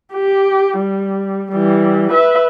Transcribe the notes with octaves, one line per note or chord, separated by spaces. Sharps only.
G4
G3
E3 G3
B4 E5